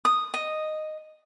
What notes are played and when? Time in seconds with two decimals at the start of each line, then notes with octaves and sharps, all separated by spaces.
0.05 D#6
0.34 D#5